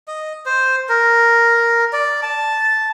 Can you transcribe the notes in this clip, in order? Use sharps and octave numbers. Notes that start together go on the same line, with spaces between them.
D#5
C5
A#4
D5
A5